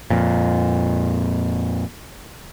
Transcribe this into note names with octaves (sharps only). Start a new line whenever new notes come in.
F2 A#2